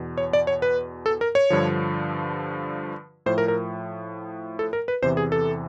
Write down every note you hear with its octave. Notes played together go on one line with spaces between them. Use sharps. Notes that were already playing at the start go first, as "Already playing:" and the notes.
Already playing: E2 B2
C#5
D5
C#5
B4
A4
A#4
C#5
G2 D3 F3
A2 F3 C5
A#4
A#4
A4
A#4
B4
E2 C3 E3 C5
G#4
A4